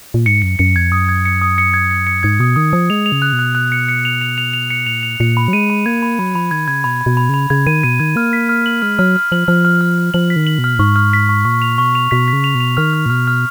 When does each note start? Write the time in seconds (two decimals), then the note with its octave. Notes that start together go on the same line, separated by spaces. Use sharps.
0.14 A#2
0.26 G#2 C#7
0.42 F#2 C#7
0.59 F#2 C#7
0.76 F2 G#6
0.91 F#2 D#6
1.09 G#6
1.25 C#7
1.41 D#6
1.58 C#7
1.74 G#6
1.91 C#7
2.07 C#7
2.23 G#2 G#6
2.40 B2 D#6
2.56 D#3 D#6
2.73 F3 D#6
2.90 G#3 F7
3.06 F7
3.12 C#3
3.22 F#6
3.33 B2
3.39 F#6
3.55 F#6
3.72 C#7
3.88 C#7
4.05 F7
4.21 F7
4.38 F7
4.54 F7
4.70 C#7
4.86 A#2 F7
5.03 F7
5.20 A#2 C#7
5.37 B5
5.48 F#3
5.53 G#3 D#7
5.70 B5
5.86 A#3 G#6
6.02 B5
6.19 F#3 B5
6.35 F3 B5
6.51 D#3 G#6
6.68 C#3 G#6
6.84 B2 B5
7.01 B5
7.06 B2
7.17 B5
7.29 C#3 B5
7.50 C#3 G#6
7.66 D#3 D#7
7.84 B2 D#7
8.00 D#3 G#6
8.16 A#3 F6
8.33 B6
8.49 F6
8.66 F#7
8.82 G#3 F6
8.99 F#3 F6
9.16 F6
9.32 F3 F#7
9.48 F3 F6
9.65 F6
9.81 F6
9.98 F6
10.14 F3 F#7
10.30 B6
10.36 D#3
10.47 F#7
10.59 B2
10.64 F6
10.75 A#2
10.79 G#2 C#6
10.96 F6
11.13 B6
11.29 C#6
11.45 A#2 C#6
11.62 F7
11.78 B2 C#6
11.95 F7
12.11 B2 B6
12.28 B6
12.33 C#3
12.44 F7
12.55 B2
12.60 F7
12.77 D#3 F6
12.93 F6
13.06 A#2
13.10 B2 F6
13.27 F6